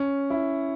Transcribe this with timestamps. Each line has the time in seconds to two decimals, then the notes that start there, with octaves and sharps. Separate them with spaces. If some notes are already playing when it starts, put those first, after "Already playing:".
Already playing: C#4
0.30 E4